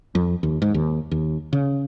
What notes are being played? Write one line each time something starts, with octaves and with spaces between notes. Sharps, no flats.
F2
D#2
G#2
D#2
D#2
C#3